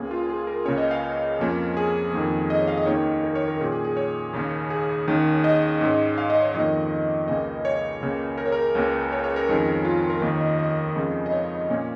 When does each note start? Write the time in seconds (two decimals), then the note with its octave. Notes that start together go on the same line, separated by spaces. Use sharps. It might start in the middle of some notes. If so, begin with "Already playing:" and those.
Already playing: C#2 C#3 A#3 G#4
0.11 F4
0.30 G#4
0.47 A#4
0.65 C#2 C#3 A#3 C#4 C#5
0.78 D#5
0.91 F5
1.39 F2 F3 A#3 C#4
1.77 G#4
2.12 F2 D#3 A#3
2.50 D#5
2.59 C#5
2.67 F5
2.77 D#5
2.86 D#2 D#3 A#3 C#4 C#5
3.24 A#4
3.35 C#5
3.48 A#4
3.60 A#2 A#3 C#4 G#4
3.72 G#4
3.84 G#4
3.97 C#5
4.33 D#2 C#3 A#3 C#4
4.70 G#4
5.07 D#2 D#3 C#4
5.44 D#5
5.81 G#2 G#3 C#4
6.18 F5
6.30 D#5
6.42 C#5
6.54 F2 D#3 A#3 D#5
7.28 C#2 C#3 A#3 C#4 D#5
7.65 C#5
8.01 C#2 C#3 A#3
8.38 A#4
8.46 C#5
8.52 A#4
8.75 C#2 C#3 A#3 C#4
9.12 C#5
9.24 C#5
9.36 A#4
9.49 F2 D#3 G#3 C#4
9.85 F4
10.10 A#4
10.22 D#2 D#3 A#3 A#4
10.41 D#5
10.59 D#5
10.96 F2 C#3 G#3 C#4
11.26 D#5
11.32 C#5
11.69 A#2 A#3 C#4